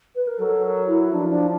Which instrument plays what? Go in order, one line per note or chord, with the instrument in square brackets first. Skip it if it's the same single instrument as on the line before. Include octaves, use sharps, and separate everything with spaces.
[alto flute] B4
A#4
[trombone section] F#3 [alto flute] A4
[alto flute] A#4
E4
[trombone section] F3 [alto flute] D4
[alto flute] D4